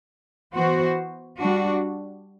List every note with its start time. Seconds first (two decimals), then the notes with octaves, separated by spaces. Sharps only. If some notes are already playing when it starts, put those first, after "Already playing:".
0.53 E3 B3 F#4 C5
1.39 G3 D4 F#4